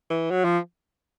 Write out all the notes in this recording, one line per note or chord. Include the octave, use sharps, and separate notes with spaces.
E3
F#3
F3